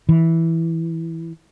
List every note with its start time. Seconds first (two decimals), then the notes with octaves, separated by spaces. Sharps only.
0.09 E3